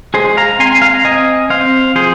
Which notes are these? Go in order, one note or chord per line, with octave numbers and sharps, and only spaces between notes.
G#3 G#4 C5
F5 A#5
C4 G#5 C6
F5 A#5
C4 D#5 G#5
C4 C5 F5
F3 G#4 C5